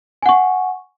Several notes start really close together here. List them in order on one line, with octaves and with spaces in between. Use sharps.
G#5 F#5 C#6